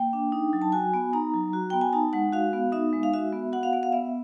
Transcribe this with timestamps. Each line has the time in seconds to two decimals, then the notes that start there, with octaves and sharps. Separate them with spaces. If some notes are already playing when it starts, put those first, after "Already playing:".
Already playing: A#3 G5
0.13 D4
0.32 D#4
0.53 F#3
0.62 A5
0.72 F#4 G#5
0.93 B3
1.13 D#4 A#5
1.34 F#3
1.53 F#4
1.70 B3 G5
1.81 G#5
1.93 D#4 A5
2.13 G#3 F#5
2.33 F#4 F5
2.53 B3
2.72 D#4 E5
2.93 G#3
3.03 F5
3.14 F#4 E5
3.32 B3
3.53 F#4 F#5
3.63 F5
3.73 B3 F#5
3.83 F5
3.92 B3 E5